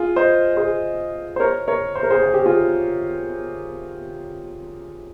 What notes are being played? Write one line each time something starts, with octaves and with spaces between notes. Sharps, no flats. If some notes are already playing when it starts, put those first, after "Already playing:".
Already playing: F4 G#4
C5 D#5
G#4 C5
C5
A#4 C#5
A#4 C#5
C5
A#4
G#4 C5
G#4
G4
F4 G#4